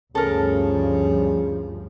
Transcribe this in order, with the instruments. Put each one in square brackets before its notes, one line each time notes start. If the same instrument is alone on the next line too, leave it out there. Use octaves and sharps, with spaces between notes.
[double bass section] D2 G2 F3 [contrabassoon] C#3 [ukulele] A4 A#4